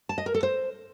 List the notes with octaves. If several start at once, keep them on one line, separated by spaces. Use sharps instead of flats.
A5
D#5
A#4
A4
C5